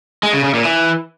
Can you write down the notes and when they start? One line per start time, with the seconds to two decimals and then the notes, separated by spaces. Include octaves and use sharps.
0.23 G#3
0.34 C#3
0.44 C#3
0.54 A#2
0.65 E3